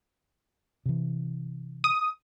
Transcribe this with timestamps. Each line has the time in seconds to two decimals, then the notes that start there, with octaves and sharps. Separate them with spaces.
0.86 C3 E3
1.84 D#6